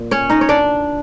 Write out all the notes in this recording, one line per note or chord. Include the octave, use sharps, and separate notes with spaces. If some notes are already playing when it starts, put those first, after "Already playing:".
Already playing: A#2
C#4 C#5
D#4 D#5
C#5
D4 D5